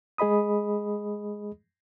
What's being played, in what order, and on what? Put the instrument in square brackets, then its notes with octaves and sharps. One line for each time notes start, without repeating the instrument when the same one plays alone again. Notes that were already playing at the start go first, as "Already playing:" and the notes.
[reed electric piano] G#3 G#4 D#5 B5 D#6